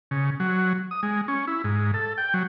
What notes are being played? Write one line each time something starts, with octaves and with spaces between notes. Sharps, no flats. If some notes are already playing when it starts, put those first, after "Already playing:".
C#3
F#3
D#6
G#3
C#4
E4
G#2
A4
G5
F#3